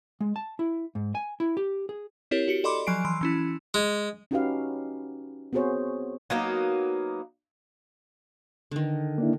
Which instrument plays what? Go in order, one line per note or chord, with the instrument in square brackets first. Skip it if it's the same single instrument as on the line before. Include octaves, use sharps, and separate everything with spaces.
[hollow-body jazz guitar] G#3
A5
E4
G#2
G#5
E4
G4
G#4
[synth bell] C4 E4 G4 A#4 C#5
F#4 G4 C#7
A4 D5 D#5 B5 C6 D6
F3 F#3 G#5 C7 D7
E3 C6
E3 C#4 E4
[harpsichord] G#3
[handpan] C#4 D#4 F#4 G4 B4 F5
B3 C4 F#4 G#4 C5 C#5
[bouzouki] F#3 A#3 B3 D#4
[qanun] D3 D#3
[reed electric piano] A#3 D4 E4